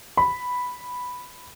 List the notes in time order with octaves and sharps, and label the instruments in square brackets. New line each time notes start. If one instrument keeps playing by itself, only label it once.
[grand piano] B5